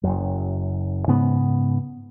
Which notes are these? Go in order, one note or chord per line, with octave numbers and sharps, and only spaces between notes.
F#1 F#2
G#2 C#3 B3